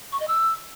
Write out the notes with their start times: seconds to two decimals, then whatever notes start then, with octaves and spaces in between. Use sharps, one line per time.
0.12 C#6
0.20 D#5
0.28 E6